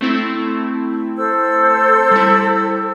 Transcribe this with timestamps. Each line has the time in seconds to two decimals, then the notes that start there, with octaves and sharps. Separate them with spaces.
0.01 A3 C4 E4
1.16 A4 C5 E6
2.12 G3 E4